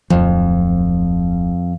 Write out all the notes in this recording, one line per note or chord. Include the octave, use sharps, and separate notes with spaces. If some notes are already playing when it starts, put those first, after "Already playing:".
D1 F2 F3